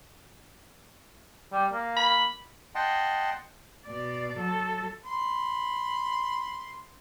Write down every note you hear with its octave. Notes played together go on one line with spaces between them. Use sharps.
G3
A#3
B5
D#5 F#5 G5 A5 C6
B2 D5
F#3 A4
B5 C6